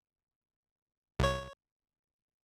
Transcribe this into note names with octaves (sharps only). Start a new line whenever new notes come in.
C2 C#5